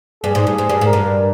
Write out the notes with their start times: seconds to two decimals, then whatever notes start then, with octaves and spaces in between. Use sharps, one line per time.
0.24 G2 G#4
0.35 G#2
0.47 G2
0.58 G#2
0.69 G2
0.81 G#2 A#4
0.93 G2